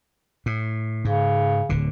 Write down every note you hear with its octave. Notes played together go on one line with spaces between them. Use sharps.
A2
G#2 C#3
D1 D3